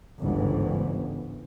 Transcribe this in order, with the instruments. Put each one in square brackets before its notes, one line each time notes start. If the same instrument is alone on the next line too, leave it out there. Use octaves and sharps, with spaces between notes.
[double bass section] G1 C#2 G#2 E3